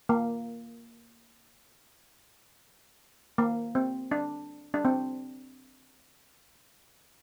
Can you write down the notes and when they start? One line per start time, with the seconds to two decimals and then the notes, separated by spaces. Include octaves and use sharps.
0.09 A#3
3.38 A#3
3.75 C4
4.11 D4
4.74 D4
4.85 C4